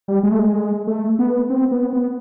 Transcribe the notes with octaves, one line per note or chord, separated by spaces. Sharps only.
G3
G#3
A3
G#3
A3
B3
C4
B3
B3